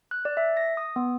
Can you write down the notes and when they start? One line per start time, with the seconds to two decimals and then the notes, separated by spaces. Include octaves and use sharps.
0.11 F#6
0.25 D5
0.37 E5
0.57 A#6
0.77 D#6
0.96 B3